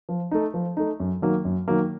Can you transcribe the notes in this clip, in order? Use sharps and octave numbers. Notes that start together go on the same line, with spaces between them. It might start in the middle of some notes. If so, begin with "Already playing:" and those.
F3
A3 D#4
F3
A3 D#4
F#2
D#3 F#3 A#3
F#2
D#3 F#3 A#3